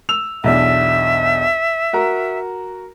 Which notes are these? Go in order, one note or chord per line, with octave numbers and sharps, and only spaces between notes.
E6 F7
B1 E2 D4 E5
F#4 A#4 A#5